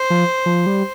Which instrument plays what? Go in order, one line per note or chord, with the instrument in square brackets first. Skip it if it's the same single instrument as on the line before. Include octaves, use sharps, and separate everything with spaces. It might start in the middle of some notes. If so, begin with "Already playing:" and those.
Already playing: [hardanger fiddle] C5
[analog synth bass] F3
F3
G3